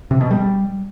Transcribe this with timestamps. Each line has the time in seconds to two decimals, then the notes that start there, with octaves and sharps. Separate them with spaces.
0.11 C3
0.21 B2
0.31 G3